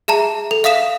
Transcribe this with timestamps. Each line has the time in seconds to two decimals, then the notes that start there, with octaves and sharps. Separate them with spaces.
0.08 G#4 E5 A5 A#5
0.51 A4
0.64 E5 F5 D#6 B6 E7